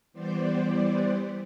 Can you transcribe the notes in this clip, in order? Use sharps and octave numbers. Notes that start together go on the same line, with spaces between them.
E3 G3 B3 C5 D5